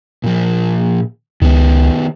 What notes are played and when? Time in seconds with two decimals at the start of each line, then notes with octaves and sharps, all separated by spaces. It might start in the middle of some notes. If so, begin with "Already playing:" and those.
0.24 A#2 F3
1.42 C#2 D#3 B3